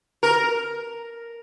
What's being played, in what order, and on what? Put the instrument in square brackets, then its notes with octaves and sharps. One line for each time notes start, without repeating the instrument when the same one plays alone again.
[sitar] A#4